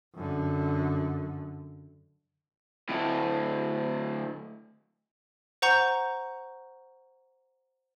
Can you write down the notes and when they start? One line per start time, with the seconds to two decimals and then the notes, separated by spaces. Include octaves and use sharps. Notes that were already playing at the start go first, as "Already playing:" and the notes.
0.15 F#2 D3
2.89 D2 A2
5.62 C5 F#5 A#5 C#6 G6